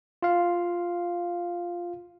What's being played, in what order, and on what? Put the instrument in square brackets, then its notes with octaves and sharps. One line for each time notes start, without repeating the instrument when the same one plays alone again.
[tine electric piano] F4 F5